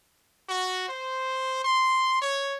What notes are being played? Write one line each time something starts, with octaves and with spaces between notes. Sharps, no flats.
F#4
C5
C6
C#5